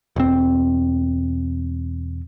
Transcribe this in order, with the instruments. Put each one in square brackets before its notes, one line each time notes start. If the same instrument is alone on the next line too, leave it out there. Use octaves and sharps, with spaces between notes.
[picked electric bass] E1 C4